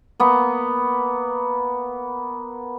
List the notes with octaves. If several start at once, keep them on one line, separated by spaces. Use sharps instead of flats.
A#3 B3